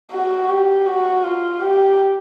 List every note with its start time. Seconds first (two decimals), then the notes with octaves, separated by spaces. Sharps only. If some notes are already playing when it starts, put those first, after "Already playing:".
0.12 F#4
0.48 G4
0.86 F#4
1.24 F4
1.60 G4